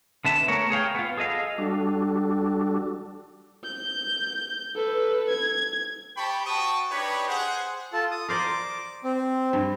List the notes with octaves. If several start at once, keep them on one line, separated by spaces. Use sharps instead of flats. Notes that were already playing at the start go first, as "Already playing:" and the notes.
D3 B3 E5 A5
A3 B3 A#4 C#5
G#4 C#5 F5 G5
B3 F4
G#4 A4 D#5 F5
G3 D4 F#4 A4
G6
A4 B4
G#6
G4 C5 G5 A5 B5 C#6
F#4 G5 A5 C#6 D#6
D4 D#4 G4 B4 C#5 D5
G#4 C5 F#5
F4 A4 A5
D#6
A#4 C5 D5 D6
C4
G2